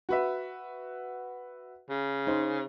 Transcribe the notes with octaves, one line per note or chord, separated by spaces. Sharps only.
F#4 B4 E5
C#3
D#4 C5